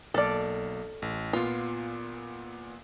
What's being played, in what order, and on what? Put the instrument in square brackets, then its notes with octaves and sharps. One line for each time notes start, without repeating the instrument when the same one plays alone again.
[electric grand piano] B1 A#3 F6 [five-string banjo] A4 D5
[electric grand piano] A1
[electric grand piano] A#2 B3 [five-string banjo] F4